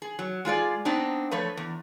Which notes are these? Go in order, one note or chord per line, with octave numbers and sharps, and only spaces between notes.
G#4
F#3
G#3 F4 G#4 D5
B3 C4 D4 D#4
F3 A3 B4 C#5
E2